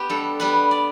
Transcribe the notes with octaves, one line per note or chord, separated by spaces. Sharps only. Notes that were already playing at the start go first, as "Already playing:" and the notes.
Already playing: B3 G4
G2 A4
G3 B3 B4
D5